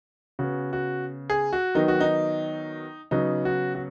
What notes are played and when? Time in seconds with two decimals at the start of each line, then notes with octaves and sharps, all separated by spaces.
0.39 C#3 B3 F#4
0.73 F#4
1.30 G#4
1.53 F#4
1.75 D#3 F#3 B3 D#4
1.88 F#4
2.01 D#4
3.11 C#3 F#3 B3 D#4
3.45 F#4
3.75 F#4